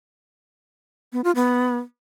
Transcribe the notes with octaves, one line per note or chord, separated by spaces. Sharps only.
B3
F4
B3